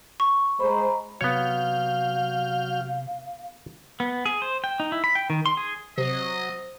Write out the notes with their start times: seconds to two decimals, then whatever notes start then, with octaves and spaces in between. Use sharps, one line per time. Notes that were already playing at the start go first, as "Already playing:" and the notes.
0.20 C#6
0.60 G#3 C5 A#5 B5
1.21 C3 F#3 B3 C#5 F5 F6 G6
4.00 B3
4.26 G#4
4.42 C5
4.64 G5
4.80 D#4
4.92 E4
5.04 B5
5.15 G5
5.30 D#3
5.46 C6
5.57 G#4
5.98 C3 F#3 C5 D#5